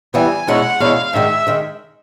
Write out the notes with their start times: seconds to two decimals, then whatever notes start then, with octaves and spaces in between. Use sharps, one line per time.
0.14 E3 G3 B3 G#5
0.47 E2 B2 G#3 C#4 E4 F#5
0.80 E2 B2 G#3 C#4 E4 F5
1.13 G#2 D#3 G#3 E5
1.47 D#3 G#3